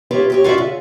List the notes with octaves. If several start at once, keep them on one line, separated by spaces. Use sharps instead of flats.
F4 G4 B4 C#5 E5
D2 G4 C#5
F4 F#4 A#4 D5 E5
C#3